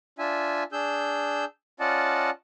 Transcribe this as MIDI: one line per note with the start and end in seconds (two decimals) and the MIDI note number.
0.19 0.63 62
0.19 0.63 65
0.19 0.63 76
0.19 0.63 80
0.72 1.45 62
0.72 1.45 68
0.72 1.45 88
0.72 1.45 91
1.80 2.30 61
1.80 2.30 65
1.80 2.30 74
1.80 2.30 75
1.80 2.30 78
1.80 2.30 81